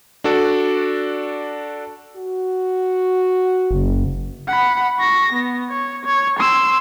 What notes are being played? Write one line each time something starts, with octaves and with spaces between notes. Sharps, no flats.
D4 F#4 A4 D5
F#4
F#1
F#5 B5
C#6 A#6
B3
C#5
C#5
C6 E6